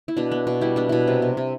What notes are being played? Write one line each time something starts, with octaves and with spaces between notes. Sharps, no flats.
E4
B2 D4
B3
B2
G3 E4
B3 D4
B2 E4
C3
C3
C3